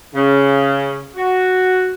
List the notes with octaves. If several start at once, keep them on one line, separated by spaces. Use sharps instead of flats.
C#3
F#4